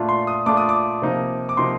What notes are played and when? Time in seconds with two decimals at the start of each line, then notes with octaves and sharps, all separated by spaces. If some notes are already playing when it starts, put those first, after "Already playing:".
Already playing: A#2 A3 D4 F4
0.09 C6
0.27 D#6
0.46 A#2 A3 D4 F4 D6
0.57 D#6
0.69 D6
1.02 C3 F3 A#3 D#4
1.49 D6
1.57 C3 F3 A#3 D#4 C6